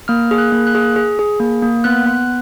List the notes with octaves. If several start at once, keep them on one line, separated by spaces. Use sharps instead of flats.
A#3 F6
G#4
F#6
A#3
F#6
G#4
G#4
G#4
A#3
A#3
B3 F#6
B3